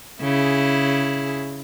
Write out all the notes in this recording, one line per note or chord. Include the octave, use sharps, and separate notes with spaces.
C#3 E4 G#4